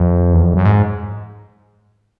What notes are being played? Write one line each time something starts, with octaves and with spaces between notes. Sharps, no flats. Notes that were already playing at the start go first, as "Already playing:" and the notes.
Already playing: F2
E2
F2
F#2
G#2